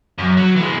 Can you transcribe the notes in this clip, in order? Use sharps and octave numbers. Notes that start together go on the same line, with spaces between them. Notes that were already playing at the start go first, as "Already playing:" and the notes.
F#2
F#3
E3 G#3